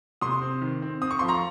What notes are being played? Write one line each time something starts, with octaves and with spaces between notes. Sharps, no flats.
C3 C6 D#6
C4
D#3
C4
C4 D#6
C#6
F3 C6
A#5 C#6